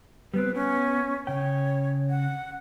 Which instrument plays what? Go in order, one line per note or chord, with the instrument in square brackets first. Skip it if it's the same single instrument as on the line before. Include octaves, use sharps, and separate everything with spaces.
[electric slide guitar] G3 B3 C4 [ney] B4
[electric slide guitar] B3 [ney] C#4
[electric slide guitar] C#3 G5 [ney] C#5
[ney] F#5